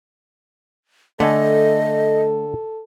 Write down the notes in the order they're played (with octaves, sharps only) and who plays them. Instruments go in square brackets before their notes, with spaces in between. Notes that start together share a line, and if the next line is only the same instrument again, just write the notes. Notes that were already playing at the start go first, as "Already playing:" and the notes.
[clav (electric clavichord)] D3 G#5 [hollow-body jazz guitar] A3 [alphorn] A4 [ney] D#5